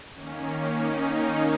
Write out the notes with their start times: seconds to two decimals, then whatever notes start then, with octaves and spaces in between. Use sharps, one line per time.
0.14 D#3 A#3 C#4
0.45 C#4
0.76 D#4
1.07 C#4